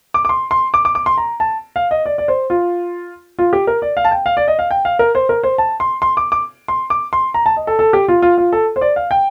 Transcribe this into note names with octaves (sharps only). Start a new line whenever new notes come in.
D6
D6
C6
C6
D6
D6
D6
C6
A#5
A5
F5
D#5
D5
D5
C5
F4
F4
G4
A#4
D5
F5
A5
G5
F5
D5
D#5
F5
G5
F5
A#4
C5
A#4
C5
A5
C6
C6
D6
D6
C6
D6
C6
A#5
A5
D#5
A4
A4
G4
F4
F4
F4
A4
C5
D5
F5
G5